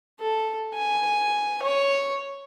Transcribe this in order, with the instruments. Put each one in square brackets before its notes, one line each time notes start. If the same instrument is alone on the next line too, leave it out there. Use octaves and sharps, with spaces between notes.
[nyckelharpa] A4
G#5
C#5